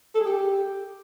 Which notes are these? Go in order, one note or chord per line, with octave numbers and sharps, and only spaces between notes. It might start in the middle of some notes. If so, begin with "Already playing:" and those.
A4
G#4
G4